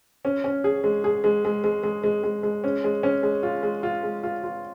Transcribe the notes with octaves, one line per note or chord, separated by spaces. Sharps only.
C#4
C#4
G#4
G#3
G#4
G#3
G#3
G#3
G#3
G#3
G#3
G#3
C#4
G#3
C#4
G#3
F4
G#3
F4
G#3
F4
F4